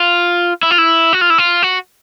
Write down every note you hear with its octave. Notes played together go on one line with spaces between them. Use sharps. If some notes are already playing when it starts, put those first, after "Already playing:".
Already playing: F4
E4
F4
E4
F#4
F4
E4
F4
F#4